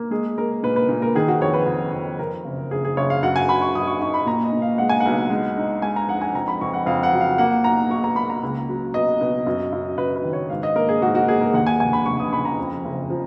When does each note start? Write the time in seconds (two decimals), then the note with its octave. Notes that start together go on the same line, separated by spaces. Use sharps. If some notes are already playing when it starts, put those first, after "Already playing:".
Already playing: A#3
0.11 G#3 G#4
0.38 G#3 A#4
0.63 A#2 B4
0.76 B4
0.89 A#2
1.02 A#4
1.15 D#3 G#4
1.28 F#4
1.41 F2 C#5
1.54 B4
1.67 F2
1.93 F2
2.19 F2 A#4
2.45 F#1
2.71 F#1 G#4
2.85 G#4
2.97 F#1 C#5
3.10 F5
3.23 F#2 F#5
3.36 G#5
3.49 F#2 B5
3.62 C#6
3.75 F#2 D#6
3.87 C#6
4.01 D#4 C#6
4.14 B5
4.26 A#2 A#5
4.44 D#5
4.53 A#2
4.62 F5
4.78 G#3 F#5
4.89 G#5
5.00 B1 F#5
5.30 G#3
5.57 D#4
5.82 G#3 G#5
5.96 A#5
6.09 F2 F#5
6.22 G#5
6.34 F2 A#5
6.48 B5
6.61 F2 C#6
6.74 F#5
6.86 F2 F5
7.03 F#5
7.12 F#3
7.21 F5
7.38 A#3 F#5
7.64 B1 A#5
7.90 B1 C#6
8.04 A#5
8.16 A#3 B5
8.30 A#5
8.43 C#2
8.69 F#3
8.94 B2 D#5
9.21 B2
9.46 F#2
9.72 F#2
9.98 F#2 B4
10.16 B4
10.24 D#3
10.33 C#5
10.50 G#2 F5
10.63 D#5
10.76 A#3 A#4
10.89 G#4
11.02 G#2 F#4
11.15 F#4
11.28 A#3 G#4
11.41 A#4
11.54 D#2 F#5
11.67 G#5
11.80 F1 G#5
11.93 B5
12.06 F1 C#6
12.20 D#6
12.32 C#3 B5
12.45 A#5
12.58 F2
12.85 F#1
13.10 F3